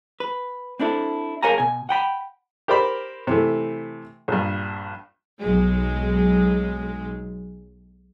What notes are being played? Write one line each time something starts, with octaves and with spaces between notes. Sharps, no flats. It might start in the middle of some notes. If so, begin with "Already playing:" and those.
B4
C4 D4 E4 A4
G#4 A#4 C#5 F5 G#5 A#5
B2 G#5
F#5 G5 B5
G4 A#4 C5 D5 B5
C3 E3 A3
A#1 G2
B1 F#3 G#3